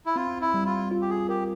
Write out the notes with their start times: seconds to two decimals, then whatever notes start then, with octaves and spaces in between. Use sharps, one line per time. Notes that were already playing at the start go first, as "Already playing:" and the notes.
0.06 E4
0.16 C4 F4
0.41 E4
0.54 G3
0.66 F4
0.91 F4
1.01 G4
1.10 G#4
1.29 G4 A#4